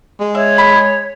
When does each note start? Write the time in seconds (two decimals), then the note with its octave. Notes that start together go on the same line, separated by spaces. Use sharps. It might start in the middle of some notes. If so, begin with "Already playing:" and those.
0.20 G#3
0.35 C#5 E5
0.58 B5